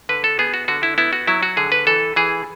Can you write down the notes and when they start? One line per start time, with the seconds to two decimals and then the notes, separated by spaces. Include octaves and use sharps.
0.09 D3 B4
0.24 A4
0.39 B3 G#4
0.54 F#4
0.68 D3 F#4
0.83 E4
0.98 B3 E4
1.13 F#4
1.27 F#3 E4
1.43 F#4
1.57 D3 G#4
1.72 B4
1.87 E3 A4
2.16 E3 G#4